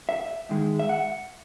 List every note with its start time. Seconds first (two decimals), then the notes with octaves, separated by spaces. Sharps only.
0.09 E5
0.49 G#2 D#3 G#3
0.79 E5
0.89 F#5